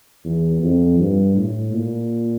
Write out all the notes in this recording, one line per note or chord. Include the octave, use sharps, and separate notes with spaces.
E2
F2
G2
A2
A#2